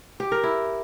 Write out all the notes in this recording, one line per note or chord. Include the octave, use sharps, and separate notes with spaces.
G4
A#4
E4